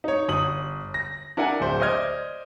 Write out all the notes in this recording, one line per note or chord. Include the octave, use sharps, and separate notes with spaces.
D#4 C#5
G1 D#6 F#7
A#6
D4 E4 A#4 F#5 G#5
D1 C5 E5
C5 D5 D#5 F6 G#6